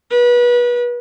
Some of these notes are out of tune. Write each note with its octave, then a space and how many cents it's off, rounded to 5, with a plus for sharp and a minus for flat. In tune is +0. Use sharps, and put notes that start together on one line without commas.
B4 -30